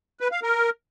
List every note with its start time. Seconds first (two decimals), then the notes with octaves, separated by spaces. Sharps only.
0.20 B4
0.32 F5
0.43 A#4